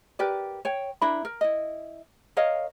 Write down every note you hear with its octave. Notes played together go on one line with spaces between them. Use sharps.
G4 A#4 B4 D5
C#5 G5
D4 E4 A#4 B5
A#4
E4 D#5
A#4 C#5 D#5 F5